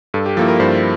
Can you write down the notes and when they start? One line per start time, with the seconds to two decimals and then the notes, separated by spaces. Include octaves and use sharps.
0.14 G2 A4
0.26 G4
0.37 F3 A#3 E4 A4
0.48 A#4
0.60 G2 C5